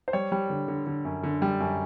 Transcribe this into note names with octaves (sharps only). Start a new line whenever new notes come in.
C5
G3 C#5
G3
D3
D3
D3
F#2
D3
G3
F#2